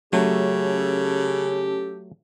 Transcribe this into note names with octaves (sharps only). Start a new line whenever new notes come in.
C#3 F#3 A3 C#4 G4 A4